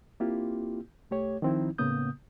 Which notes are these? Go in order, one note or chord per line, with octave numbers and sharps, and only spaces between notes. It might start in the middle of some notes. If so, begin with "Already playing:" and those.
A#3 C4 E4 F4 G4
C2 A3 G4 C#5
D#3 F3 C4 D#4 E4
A2 C#3 A#3 B3 D#6 G6